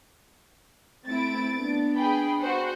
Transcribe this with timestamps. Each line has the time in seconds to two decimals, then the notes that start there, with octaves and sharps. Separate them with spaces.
1.06 A3 C4 E4 A6 D7
1.54 B3 D4
1.96 G#4 G5 B5
2.39 F#4 C5 F#5